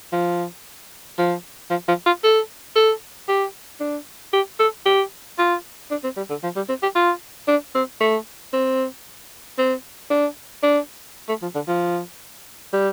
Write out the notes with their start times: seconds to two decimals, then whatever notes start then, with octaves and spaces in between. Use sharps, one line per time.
0.13 F3
1.18 F3
1.70 F3
1.88 F3
2.06 F4
2.24 A4
2.76 A4
3.29 G4
3.81 D4
4.33 G4
4.60 A4
4.86 G4
5.38 F4
5.91 D4
6.04 C4
6.17 G3
6.30 D3
6.44 F3
6.56 G3
6.69 C4
6.83 G4
6.95 F4
7.48 D4
7.75 C4
8.01 A3
8.53 C4
9.58 C4
10.10 D4
10.63 D4
11.29 A3
11.42 F3
11.55 D3
11.68 F3
12.73 G3